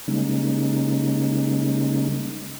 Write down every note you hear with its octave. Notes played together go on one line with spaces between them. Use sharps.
C#3 G3 G#3 A#3 C#4 D#4